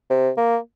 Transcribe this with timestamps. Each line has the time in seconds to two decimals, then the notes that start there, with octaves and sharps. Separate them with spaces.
0.10 C3
0.37 A#3